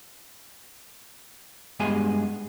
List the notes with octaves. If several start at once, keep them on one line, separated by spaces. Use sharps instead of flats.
G2 G#3 B3 F#4 G#4 G#5